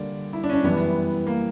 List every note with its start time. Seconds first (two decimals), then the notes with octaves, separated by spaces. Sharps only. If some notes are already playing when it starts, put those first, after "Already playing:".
Already playing: D3 G3 A#3 D5
0.33 E4
0.44 D4
0.50 C#4
0.54 D4
0.64 F#2 E3 G3 B3
1.27 A#3